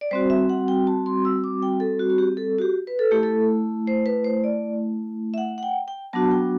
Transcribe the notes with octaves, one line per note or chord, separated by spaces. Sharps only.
D5
G3 C4 F#4 C5
E5
F#5
G5
A5
C6
E6
D6
G5
A4
F#4
F#4
G4
A4
F#4
G4
B4
A4
A3 E4 G4
A4
C5
B4
C5
D5
E5
F#5
F#5
G5
G5
F#3 B3 D4 F#4 A5
G5